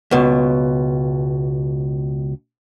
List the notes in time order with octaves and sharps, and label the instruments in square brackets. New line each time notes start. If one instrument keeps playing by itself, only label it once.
[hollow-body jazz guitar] C#2 B2